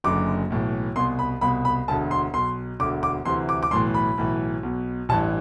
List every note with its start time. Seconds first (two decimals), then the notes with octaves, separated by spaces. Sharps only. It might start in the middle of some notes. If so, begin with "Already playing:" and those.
0.04 F#1 F#2 D3 D6
0.50 B1 A2 E3
0.96 C2 B2 C6
1.19 B5
1.41 C2 B2 B5
1.65 B5
1.88 E1 D2 D3 A5
2.11 C6
2.34 B1 B2 C6
2.80 E1 D2 D3 D6
3.03 D6
3.25 D2 C3 E3 C6
3.49 D6
3.63 D6
3.71 B1 A2 E3 C6
3.94 B5
4.18 B1 A2 E3
4.63 B1 B2
5.09 A1 G2 E3 A5